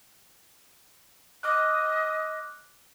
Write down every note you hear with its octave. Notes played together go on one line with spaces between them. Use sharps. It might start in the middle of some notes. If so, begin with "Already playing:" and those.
D#5 D6 F6 F#6